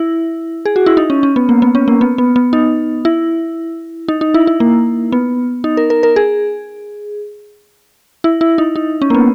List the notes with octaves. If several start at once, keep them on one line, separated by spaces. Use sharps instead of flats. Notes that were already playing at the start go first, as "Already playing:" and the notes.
Already playing: E4
G#4
F#4
E4
D#4
C#4
C#4
B3
A#3
B3
C#4
A#3
B3
B3
B3
D#4
E4
D#4
D#4
E4
E4
A#3
B3
D#4
A#4
A#4
A#4
G#4
E4
E4
D#4
D#4
C#4
A#3
B3